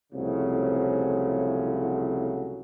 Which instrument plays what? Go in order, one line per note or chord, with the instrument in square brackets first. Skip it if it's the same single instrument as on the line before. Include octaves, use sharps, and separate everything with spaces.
[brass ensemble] C2 F2 A2 C#3 F#3